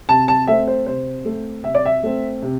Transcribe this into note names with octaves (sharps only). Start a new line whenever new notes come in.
C3 A5
A5
A3 C4 E5
C5
C3 C5
A3 C4
C3 E5
D5
E5
A3 C4
C3